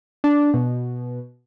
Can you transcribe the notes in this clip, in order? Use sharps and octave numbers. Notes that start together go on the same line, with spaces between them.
D4
B2